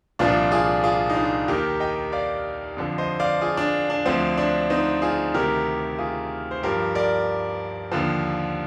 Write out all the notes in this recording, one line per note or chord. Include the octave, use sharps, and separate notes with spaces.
C2 A#2 F3 D4 F4
F4 G#4
F4 G#4
D#4
D4 F4
D#2 D#3 G4 A#4
D#5 G5
D5 F5
F2 D3 F3
C5 D#5
D5 F5
F4 G#4
D4
D4
D2 D3 F3 C4
D4
C4 D#4
F4 G#4
D2 C3 D#3 G4 A#4
F4 G#4
C5
G2 F3 G4 A#4
A#4 D5
D#2 D3 F3